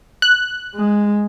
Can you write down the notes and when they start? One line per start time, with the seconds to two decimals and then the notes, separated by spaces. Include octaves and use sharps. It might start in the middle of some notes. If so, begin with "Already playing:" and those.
0.22 F#6
0.75 G#3